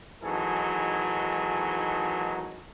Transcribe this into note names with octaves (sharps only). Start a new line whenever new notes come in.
G#1 E3 F#3 D#4 G#4 A4